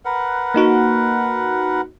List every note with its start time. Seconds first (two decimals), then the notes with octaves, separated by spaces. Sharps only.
0.05 A#4 B4 F#5
0.54 A#3 D#4 F#4